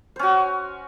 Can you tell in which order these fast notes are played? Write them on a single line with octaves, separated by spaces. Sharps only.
C5 C#4 F#4